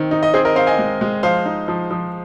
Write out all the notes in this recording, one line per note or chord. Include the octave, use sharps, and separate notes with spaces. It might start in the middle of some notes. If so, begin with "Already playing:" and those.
Already playing: D#3 C4
D#4
D#5
C4 G#4 C5
A#4 D#5
C4 C5 F5
D#5 G#5
G#3
G#3
F3 C5 F5
D#4
F3
F3